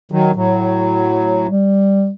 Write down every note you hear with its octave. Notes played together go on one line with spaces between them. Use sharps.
D#3 F#3
A2 F#3
G3